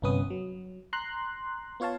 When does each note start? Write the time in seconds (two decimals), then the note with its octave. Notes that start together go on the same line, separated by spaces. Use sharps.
0.02 G1 C2 B3 C#4 B4 D#6
0.30 F#3
0.93 A#5 C6 F#6
1.80 B3 F4 C#5 F5 A5